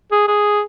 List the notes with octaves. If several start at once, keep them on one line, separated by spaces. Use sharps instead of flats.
G#4
G#4